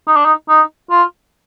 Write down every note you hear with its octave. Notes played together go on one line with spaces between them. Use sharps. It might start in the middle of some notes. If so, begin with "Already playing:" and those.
D#4
D4
D#4
D#4
F4